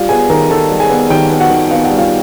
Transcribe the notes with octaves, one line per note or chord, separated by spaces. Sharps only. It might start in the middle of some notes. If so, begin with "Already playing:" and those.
Already playing: G3 F4 F5
B3 G#4 G#5
D#3 A#4 A#5
D#3 A4 A5
G3
G#4 G#5
B3
D#3 G4 G5
B3
F#4 F#5
D#3
B3 F5
F#5
G3
F4 F5